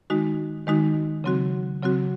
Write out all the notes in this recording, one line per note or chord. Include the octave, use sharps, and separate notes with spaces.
D#3 G#3 D#4 F#4
D#3 G#3 D#4 F#4
C#3 F#3 C4 F#4
C#3 F#3 C4 F#4